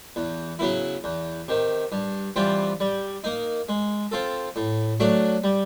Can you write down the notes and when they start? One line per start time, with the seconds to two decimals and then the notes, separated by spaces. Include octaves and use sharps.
0.16 E2
0.59 C#3 F#3 B3 E4
1.04 E2
1.48 C3 D#3
1.92 G2
2.36 E3 G3 C4 F4
2.80 G3
3.24 A#3 D#4
3.69 G#3
4.12 C4 F4 A4
4.56 A2
5.00 F#3 A3 D4 F#4
5.44 G3